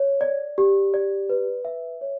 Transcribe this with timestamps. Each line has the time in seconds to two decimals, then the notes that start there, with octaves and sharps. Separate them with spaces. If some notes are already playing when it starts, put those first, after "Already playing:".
Already playing: C#5
0.21 D5
0.58 G4
0.94 D5
1.29 B4
1.65 E5
2.01 C#5